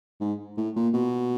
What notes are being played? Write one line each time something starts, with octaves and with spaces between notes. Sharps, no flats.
G#2
A2
A#2
B2